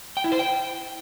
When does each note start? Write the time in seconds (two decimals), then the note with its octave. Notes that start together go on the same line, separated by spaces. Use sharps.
0.17 G5
0.24 E4
0.32 C5
0.39 G5